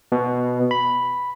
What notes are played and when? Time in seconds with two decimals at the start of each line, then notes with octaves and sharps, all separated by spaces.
0.12 B2
0.71 B5